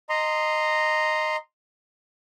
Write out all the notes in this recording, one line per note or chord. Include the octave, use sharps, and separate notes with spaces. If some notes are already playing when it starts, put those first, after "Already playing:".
D#5 A#5 C6